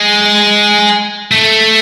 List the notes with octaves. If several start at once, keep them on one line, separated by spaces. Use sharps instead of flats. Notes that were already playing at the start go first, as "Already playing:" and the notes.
Already playing: G#3
A3